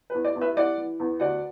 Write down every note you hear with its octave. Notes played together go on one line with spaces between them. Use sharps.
B4
E2
D5
E2
B4 E5
E3 D5 F#5
E3
E2
D2 D5 F#5